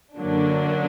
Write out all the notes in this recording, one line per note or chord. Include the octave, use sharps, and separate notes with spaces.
F#2 D3 F#3 A#3 D4